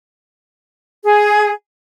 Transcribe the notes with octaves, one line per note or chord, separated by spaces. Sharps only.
G#4